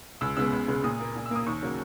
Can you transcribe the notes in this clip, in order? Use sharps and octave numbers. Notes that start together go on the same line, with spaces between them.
C#2 E6
C#3 G#3 B3 E6
C#2
C#3 G#3 B3
A#2 D#6
A#3
A#2
E6
A#3 D#6
D#2 C#6
C#3 F#3 A#3